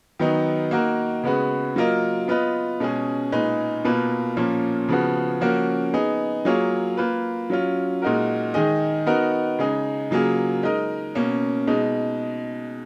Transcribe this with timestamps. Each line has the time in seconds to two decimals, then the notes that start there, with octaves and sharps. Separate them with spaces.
0.19 D#3 F#3 B3 D#4
0.71 A#3 D#4 F#4 A#4
1.24 C#3 G#3 B3 F#4 B4
1.76 F#3 A#3 F4 A#4 D#5
2.28 B3 F4 B4 D#5
2.80 B2 G#3 C#4 G#4
3.32 A#2 G#3 D#4 G#4 B4
3.84 B2 A#3 F4 B4
4.37 A#2 F3 A#3 C#4
4.88 C#3 F3 B3 F#4
5.41 F3 A#3 C#4 F#4 A#4
5.94 B3 D#4 G#4
6.45 F#3 A#3 F4 G#4 C#5
6.97 A#3 F4 B4
7.50 F#3 C#4 F4
8.02 A#2 G#3 D#4 F#4 A#4
8.54 D#3 G#3 D#4 G#4 D#5
9.06 B3 D#4 F#4 A#4
9.59 C#3 G#3 D#4 G#4
10.11 C#3 F#3 A#3 F4 G#4
10.63 G#3 D#4 A#4 D#5
11.15 B2 A#3 C#4
11.67 B2 G#3 D#4